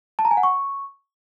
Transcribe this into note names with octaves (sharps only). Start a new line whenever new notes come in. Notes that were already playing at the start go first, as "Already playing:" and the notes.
A5
A#5
G#5
F#5
C#6